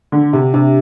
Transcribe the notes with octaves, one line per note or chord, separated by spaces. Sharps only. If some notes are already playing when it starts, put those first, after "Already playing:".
D3
C3
C3 D4 G4 E5